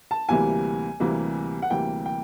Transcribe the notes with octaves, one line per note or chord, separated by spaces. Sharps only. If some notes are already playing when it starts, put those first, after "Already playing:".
A5
D2 C3 E3 G3 A#3 G#5
D2 C3 E3 G3 A#3
F#5
D2 C3 E3 G3 A#3 G5
G5